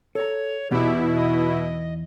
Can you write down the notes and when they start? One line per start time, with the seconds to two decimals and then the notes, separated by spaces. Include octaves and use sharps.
0.15 A4 C#5 A#5
0.71 E2 B2 B3 D#4 E4 G4
1.15 D#5